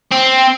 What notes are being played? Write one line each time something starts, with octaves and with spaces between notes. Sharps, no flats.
C4